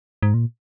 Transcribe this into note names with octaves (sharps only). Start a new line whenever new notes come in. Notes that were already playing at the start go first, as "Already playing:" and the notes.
G#2
A#2